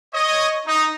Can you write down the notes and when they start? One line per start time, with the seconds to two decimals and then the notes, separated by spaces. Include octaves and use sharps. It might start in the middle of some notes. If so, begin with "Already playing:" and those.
0.14 C#5 D#5
0.66 D#4